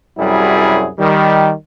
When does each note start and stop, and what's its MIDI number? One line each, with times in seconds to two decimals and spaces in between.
0.17 0.88 36
0.17 0.88 42
0.17 0.88 54
0.17 0.88 55
0.17 0.88 64
0.17 0.88 68
0.99 1.51 51
0.99 1.51 55